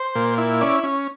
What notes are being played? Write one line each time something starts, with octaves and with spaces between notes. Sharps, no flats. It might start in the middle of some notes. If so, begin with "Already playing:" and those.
Already playing: C5
A#2
E4
C#4 D5
C#4